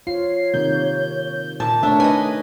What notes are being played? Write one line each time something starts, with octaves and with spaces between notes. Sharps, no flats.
F4 C#5 C7
C3 D#3 A#3 G6
A#2 A5
A3 D4 A#4 C#5 E5
D#4 B4 D#5 G#5